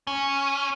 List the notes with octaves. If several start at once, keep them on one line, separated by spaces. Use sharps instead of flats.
C#4